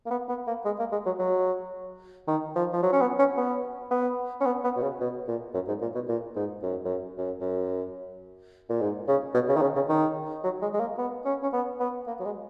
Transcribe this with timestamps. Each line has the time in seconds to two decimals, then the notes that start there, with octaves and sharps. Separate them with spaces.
0.06 A#3
0.11 B3
0.29 B3
0.47 A#3
0.65 G#3
0.79 A#3
0.92 G#3
1.06 F#3
1.19 F#3
2.28 D#3
2.56 F3
2.73 F3
2.83 F#3
2.92 C#4
3.01 B3
3.19 C#4
3.37 B3
3.91 B3
4.41 C#4
4.46 B3
4.64 B3
4.76 B2
4.82 C#3
5.00 B2
5.28 A#2
5.54 F#2
5.68 G#2
5.82 A#2
5.95 B2
6.09 A#2
6.36 G#2
6.63 F#2
6.85 F#2
7.18 F#2
7.41 F#2
8.69 A#2
8.81 G#2
9.08 C#3
9.34 B2
9.48 C#3
9.56 D#3
9.62 C#3
9.76 C#3
9.89 D#3
10.44 F#3
10.62 G#3
10.74 G#3
10.80 A#3
10.98 B3
11.25 C#4
11.43 C#4
11.53 B3
11.80 B3
12.07 A#3
12.20 F#3
12.25 G#3